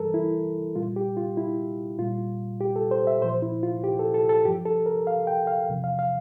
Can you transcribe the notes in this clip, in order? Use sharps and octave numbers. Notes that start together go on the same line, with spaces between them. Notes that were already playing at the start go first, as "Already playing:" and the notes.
Already playing: G2 E3 G3 A4 A#4
E4
A#2 G3 F4
G4
F4
E4
A#2 G3 F4
G4
A4
C5
E5
A#2 F3 C5
E4
F4
G4
A4
A4
A4
G2 F3 G4
A4
A#4
F5
G5
F5
E2 C3 F3
F5
F5